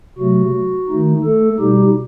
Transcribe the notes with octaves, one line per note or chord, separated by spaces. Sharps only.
C3 F#3 A3 F#4
D#3 A3 D#4
A3 A4
B2 G3 D#4 G4